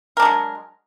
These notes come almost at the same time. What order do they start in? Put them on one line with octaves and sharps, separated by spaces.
A#4 D4 G#3 F#3